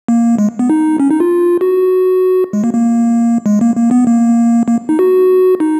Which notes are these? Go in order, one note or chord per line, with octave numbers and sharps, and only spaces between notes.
A#3
G#3
B3
D#4
C#4
D#4
F4
F#4
G#3
A#3
A#3
G#3
A#3
A#3
B3
A#3
A#3
D#4
F#4
D#4